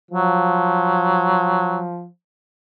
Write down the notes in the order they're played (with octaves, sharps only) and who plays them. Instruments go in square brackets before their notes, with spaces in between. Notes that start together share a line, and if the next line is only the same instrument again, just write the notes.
[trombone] F3 [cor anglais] F#3